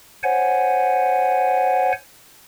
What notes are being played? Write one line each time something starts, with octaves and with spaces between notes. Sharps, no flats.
C5 C#5 F#5 G#5